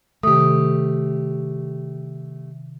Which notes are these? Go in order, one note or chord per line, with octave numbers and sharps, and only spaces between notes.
C3 D#3 A3 G4 D#6